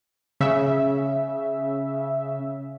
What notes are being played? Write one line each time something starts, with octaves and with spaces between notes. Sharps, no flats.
C#3 E5